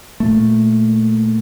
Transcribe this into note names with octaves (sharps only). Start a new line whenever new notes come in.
A#2 A3